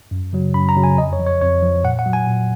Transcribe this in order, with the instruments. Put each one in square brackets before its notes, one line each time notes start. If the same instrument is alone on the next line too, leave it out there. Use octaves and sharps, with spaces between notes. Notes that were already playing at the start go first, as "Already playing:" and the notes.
[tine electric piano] F#2
C#3 F#3
F#2 B5
A#5
C#3 F#3
G#5
F2 D#5
C#5
F3
C#5
F2 C#5
F3
A#2 F#5
F#5
F#3
G#5
A#2